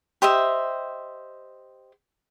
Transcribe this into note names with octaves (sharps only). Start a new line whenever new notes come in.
G4 C5 D#5 E5